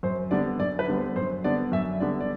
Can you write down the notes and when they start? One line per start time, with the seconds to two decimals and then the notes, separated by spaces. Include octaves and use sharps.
0.03 F#2 C5
0.31 D3 G3 B3 D5
0.59 F#2 D5
0.79 B4
0.88 D3 G3 B3
0.97 C5
1.16 F#2 C5
1.44 D3 G3 B3 D5
1.72 F#2 E5
2.00 D3 G3 B3 D5
2.21 D5